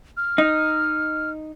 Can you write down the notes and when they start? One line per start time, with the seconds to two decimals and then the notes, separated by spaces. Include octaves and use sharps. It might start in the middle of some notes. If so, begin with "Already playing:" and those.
0.17 F6
0.38 D#4